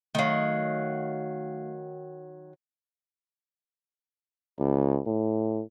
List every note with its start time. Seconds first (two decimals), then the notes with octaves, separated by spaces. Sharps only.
0.15 D#3 F#3 A3 F5
4.60 C#2
5.06 A2